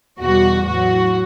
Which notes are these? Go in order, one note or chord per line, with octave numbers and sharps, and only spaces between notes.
E2 B2 G3 F#4
A2 F#3 F#4